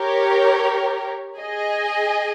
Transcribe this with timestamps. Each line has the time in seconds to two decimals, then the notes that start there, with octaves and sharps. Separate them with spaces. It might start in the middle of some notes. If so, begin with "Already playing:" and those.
Already playing: G4 A#4 C#5
1.37 G#4 D#5 G#5